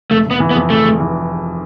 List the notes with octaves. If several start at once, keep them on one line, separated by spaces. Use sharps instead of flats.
F1 A3
F1
B3
E3
B3
F2
F1 A3
F1
E3